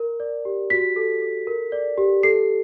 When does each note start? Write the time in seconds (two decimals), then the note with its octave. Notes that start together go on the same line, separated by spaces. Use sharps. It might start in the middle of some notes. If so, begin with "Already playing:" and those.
Already playing: A#4
0.20 D5
0.45 G4
0.70 F#4 B6
0.96 A4
1.22 A4
1.47 A#4
1.72 D5
1.98 G4
2.23 A4 C7